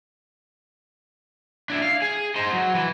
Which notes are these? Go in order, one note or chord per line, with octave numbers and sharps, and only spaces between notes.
D4 E4
F5
G#4
D#4 C5
F#3
E3